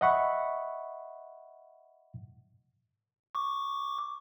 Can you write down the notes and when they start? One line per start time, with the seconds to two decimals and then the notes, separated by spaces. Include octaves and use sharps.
0.01 D#5 E5 F#5 B5 C#6
3.35 C#6 D6